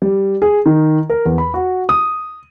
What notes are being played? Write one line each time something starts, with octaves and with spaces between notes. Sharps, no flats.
G3
G#4
D#3
A#4
E2
B5
F#4
D#6